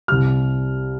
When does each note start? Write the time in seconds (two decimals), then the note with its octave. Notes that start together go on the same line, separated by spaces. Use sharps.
0.08 C2 C3 G3 F6